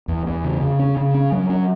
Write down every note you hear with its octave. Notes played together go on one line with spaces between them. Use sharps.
E2
E2
C#3
C#3
C#4
C#3
C#4
F#3
C#4